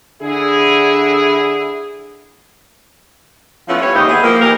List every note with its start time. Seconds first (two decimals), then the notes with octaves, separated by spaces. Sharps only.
0.22 D3 E4 G#4
3.68 F3 A3 B3 C#4 E4
3.81 G3 B4 C#5
3.94 D#2 G#2 E3 G4 D#5
4.08 B3 E4 G4 G#4
4.22 F3 A#3
4.41 E3 D#4 G4 A#4